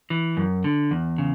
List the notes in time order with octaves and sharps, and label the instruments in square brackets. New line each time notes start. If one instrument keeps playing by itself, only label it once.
[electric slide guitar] E3
F#2
D3
E2
C#3